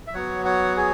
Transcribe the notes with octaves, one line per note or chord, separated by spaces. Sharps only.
E5
F#3 B3 F#4 C#5 F#5
C#5 F#5
G#4 C#5